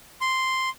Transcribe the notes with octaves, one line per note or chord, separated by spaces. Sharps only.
C6